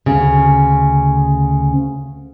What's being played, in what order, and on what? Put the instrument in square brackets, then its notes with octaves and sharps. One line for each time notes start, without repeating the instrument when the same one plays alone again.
[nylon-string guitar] D2 C#3